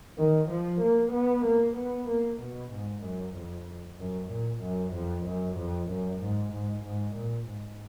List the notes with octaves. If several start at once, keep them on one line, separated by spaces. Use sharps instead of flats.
D#3
F3
A#3
B3
A#3
B3
A#3
B2
G#2
F#2
F2
F#2
A#2
F#2
F2
F#2
F2
F#2
G#2
G#2
G#2
A#2
G#2